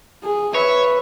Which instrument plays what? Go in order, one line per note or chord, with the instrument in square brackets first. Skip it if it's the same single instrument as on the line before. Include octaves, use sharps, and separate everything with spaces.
[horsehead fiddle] G#4
[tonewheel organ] B4 [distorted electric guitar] C#5 [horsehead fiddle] E5